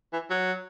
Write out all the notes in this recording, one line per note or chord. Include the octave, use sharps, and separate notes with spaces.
E3
F#3